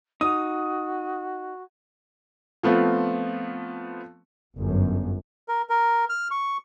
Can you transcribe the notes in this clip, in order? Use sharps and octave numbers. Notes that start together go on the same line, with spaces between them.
D#4 F#4 D#6
F3 A3 B3 C4 F4
G1 F#2
A#4
A#4
F6
C#6